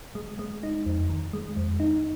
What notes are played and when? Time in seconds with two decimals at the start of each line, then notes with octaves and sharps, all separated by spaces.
0.15 G#3
0.39 G#3
0.63 D#4
0.86 F2
1.10 D#3
1.33 G#3
1.57 F2
1.80 D#4